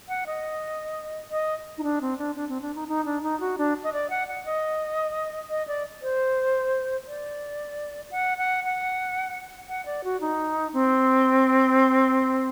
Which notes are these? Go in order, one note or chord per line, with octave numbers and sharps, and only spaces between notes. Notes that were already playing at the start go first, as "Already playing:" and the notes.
F#5
D#5
D#5
D#4
D4
C4
D4
D4
C4
D4
D#4
D#4
D4
D#4
F#4
D4
D#5
D5
F#5
F#5
D#5
D#5
D5
C5
D5
F#5
F#5
F#5
F#5
D5
F#4
D#4
C4